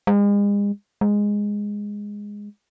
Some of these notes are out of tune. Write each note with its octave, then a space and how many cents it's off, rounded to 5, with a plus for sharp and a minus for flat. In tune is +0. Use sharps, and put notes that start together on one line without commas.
G#3 -40
G#3 -10